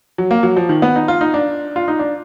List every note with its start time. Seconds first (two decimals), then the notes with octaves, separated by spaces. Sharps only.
0.18 F#3
0.31 A#3
0.43 F#3
0.56 F3
0.69 D#3
0.82 B3
0.96 D#4
1.08 F4
1.21 D#4
1.34 D4
1.76 F4
1.88 D#4
1.99 D4